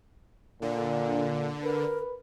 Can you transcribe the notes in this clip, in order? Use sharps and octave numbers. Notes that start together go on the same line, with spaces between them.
A#2 D3
A#4 B4